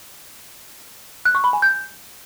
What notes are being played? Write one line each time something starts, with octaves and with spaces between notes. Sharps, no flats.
F#6
C#6
B5
G#5
G6